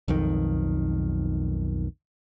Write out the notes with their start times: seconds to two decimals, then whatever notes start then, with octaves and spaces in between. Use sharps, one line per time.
0.08 B1 F2 D#3